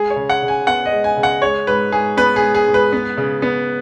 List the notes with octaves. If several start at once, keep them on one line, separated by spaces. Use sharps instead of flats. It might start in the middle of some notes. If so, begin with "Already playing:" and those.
Already playing: G#3 G#4
C#5
C#3
F#5
C#3
G#5
B3 F#5
D#5
G#3
G#5
C#3
F#5
G#3 C#5
G#2 B4
G#2 G#4
B3 B4
G#4
G#3
G#4
G#2
B4
B3
C#3
B3